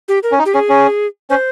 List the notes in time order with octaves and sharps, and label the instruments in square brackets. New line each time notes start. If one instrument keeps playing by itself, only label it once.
[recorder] G4
A#4
[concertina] C#4
D#4
[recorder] G4
[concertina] C#4 [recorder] G#4
[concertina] C#4
[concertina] C#4 [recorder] C5